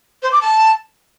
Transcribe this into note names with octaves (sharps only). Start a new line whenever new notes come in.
C5
D6
A5